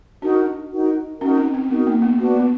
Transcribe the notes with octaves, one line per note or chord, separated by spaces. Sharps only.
D4 D#4 F#4 A#4
D#4 F#4 A#4
C#4 D#4 F#4 A#4
C4
C4
B3 D#4 F#4 A#4
A#3
B3
B3 D4 F#4 B4
B3